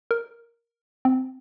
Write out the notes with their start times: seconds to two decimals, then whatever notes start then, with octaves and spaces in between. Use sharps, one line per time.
0.11 A#4
1.05 C4